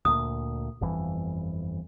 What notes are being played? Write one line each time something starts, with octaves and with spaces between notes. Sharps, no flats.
D2 A#2 D#6
G1 F2 E3